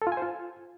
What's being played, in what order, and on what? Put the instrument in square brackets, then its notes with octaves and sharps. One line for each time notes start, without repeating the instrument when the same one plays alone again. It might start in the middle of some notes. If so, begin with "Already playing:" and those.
[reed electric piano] A4
F4
G#5
C5
F4